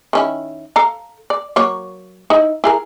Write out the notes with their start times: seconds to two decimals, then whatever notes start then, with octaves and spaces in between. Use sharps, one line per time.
0.13 D#3 C#4 E4
0.76 A4 F5 A#5
1.30 D5
1.56 F#3 A#3 C#5
2.30 D#4 E4
2.64 E4 G#4 A#4